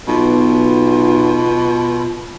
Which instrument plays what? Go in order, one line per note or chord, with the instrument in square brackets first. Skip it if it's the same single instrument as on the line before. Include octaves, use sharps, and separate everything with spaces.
[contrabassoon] B1 [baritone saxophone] B2 [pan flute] F4